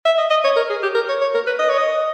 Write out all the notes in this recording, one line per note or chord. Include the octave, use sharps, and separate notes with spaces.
E5
D#5
D#5
C#5
A#4
G#4
G4
A#4
C#5
C#5
A#4
B4
D#5
C#5
D#5